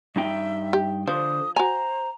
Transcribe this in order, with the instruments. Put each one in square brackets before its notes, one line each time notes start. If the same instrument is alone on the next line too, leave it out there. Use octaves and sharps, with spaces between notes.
[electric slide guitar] G2 D#4 G5 [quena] E5
[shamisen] G4
[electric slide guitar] D3 C5 [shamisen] F3 [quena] D#6
[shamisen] F#4 G#5 [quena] C5 [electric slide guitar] A#5